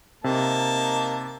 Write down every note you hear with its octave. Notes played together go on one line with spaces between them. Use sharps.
C3 A#3 D#4 A5